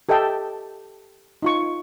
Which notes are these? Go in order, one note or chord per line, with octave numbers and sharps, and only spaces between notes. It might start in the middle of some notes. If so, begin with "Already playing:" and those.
G4 A4 D#5 E5 G5 A5
D#4 F4 C#6